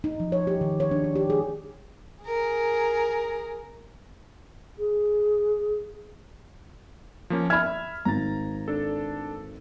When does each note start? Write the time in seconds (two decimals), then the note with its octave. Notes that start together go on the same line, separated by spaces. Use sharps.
0.04 D#4
0.20 F3
0.32 C#5
0.47 G4
0.61 D#3
0.80 C#5
0.91 D4
1.04 D4
1.16 G4
1.30 G#4
2.24 G#4 A#4
4.78 G#4
7.30 F3 A#3 C#4
7.50 E5 B5 F6 G#6
8.05 G#1 A#5 A6
8.68 D4 A4